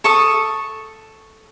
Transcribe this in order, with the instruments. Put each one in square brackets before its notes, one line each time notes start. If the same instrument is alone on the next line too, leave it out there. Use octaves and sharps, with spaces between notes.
[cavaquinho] A4 C#6 D#6